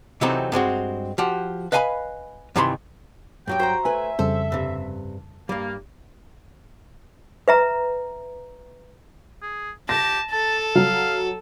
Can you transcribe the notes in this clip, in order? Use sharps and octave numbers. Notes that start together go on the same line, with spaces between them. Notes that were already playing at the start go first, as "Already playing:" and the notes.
C3 E3 F#3 A3 C4 D#4
G2 G#3 C4 F#4
F3 F#4 G4
B4 D#5 F5 G#5 A#5 B5
G2 C3 D#3 E3 B5 C6
G2 F#3 G4 G5
F#4 C5 A#5
A3 B4 E5 G#5
F2 C#3 G3 A4 C5
G2 C3
G2 G3 A#3
B4 E5 A#5
G#4
G4 A5 A#6
A4 A5
F#3 F5